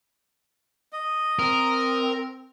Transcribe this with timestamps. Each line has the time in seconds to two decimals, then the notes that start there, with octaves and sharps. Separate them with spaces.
0.93 D#5
1.40 C4 A#4